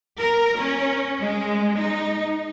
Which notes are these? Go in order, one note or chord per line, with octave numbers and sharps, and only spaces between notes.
A#4
C#4
G#3
D#4